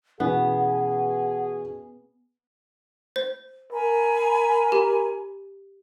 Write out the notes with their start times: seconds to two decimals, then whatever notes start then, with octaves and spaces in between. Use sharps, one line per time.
0.20 B2 E3 B3 C#4 G#4 F#5
3.16 C5
3.72 A#4 G#5 A#5 B5
4.72 G4